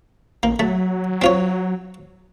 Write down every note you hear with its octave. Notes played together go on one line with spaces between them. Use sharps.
A1 A#3
F#3 A3
C4 F4 C#5